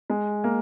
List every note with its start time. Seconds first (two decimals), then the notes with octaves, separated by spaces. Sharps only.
0.10 G#3
0.44 A#3